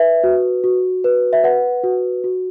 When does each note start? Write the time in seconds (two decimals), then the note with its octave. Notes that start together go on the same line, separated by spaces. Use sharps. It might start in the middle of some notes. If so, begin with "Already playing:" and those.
Already playing: B4 E5
0.24 F#4
0.64 F#4
1.04 B4
1.33 E5
1.44 B4 F#5
1.84 F#4
2.24 F#4